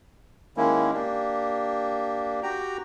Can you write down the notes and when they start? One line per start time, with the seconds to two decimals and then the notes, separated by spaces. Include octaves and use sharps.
0.57 D#3 G#3 A#3 C#4 E4
0.93 A#3 D4 G4
2.43 F#4 G4 G5 A#5